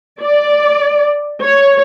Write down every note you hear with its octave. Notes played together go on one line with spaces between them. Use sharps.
D5
C#5